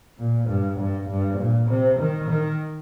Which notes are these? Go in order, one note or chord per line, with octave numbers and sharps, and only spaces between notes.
A#2
G2
G2
G2
A#2
C3
D#3
D#3